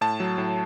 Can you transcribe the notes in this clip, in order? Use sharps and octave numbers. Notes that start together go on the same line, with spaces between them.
A2 A5
F#3
A2